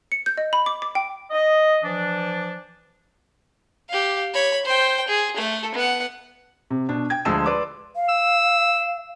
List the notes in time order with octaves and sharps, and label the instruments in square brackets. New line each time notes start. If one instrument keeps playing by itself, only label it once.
[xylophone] C#7
G6
D#5
B5
D6
D6
G5
[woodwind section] D#5
E3 F3 D4
[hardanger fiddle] G4 F5
C#5 B5
C5 G5
G#4
A3 A4
B3 F#5
[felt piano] C3
B2 D4
G5 G#6
D2 F3 G#3 A5 E6 E7
B4 D5 C6 D6
[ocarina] F5
[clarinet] E6